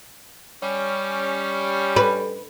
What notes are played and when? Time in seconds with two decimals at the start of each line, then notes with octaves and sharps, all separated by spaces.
0.62 G3 C#4
1.96 B4